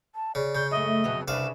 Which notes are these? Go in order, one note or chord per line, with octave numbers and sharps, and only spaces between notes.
A5
C#3 D5
C#3 G6
F#2 A3 D#5 E5
F2 B2 F#3
C2 C#3 D4 B4 E5 F5 E7